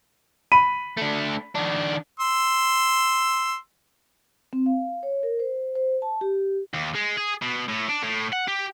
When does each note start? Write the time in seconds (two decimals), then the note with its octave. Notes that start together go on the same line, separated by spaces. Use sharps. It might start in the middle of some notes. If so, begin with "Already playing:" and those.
0.52 B5 D#7
0.97 A3 D4
1.55 D#3 D4
2.20 C6 E6
4.53 C4
4.66 F5
5.03 C#5
5.23 A#4
5.39 C5
5.75 C5
6.02 A5
6.21 G4
6.74 D#2
6.95 G#3
7.17 G#4
7.42 B2
7.68 A2
7.89 D4
8.03 A2
8.33 F#5
8.48 G4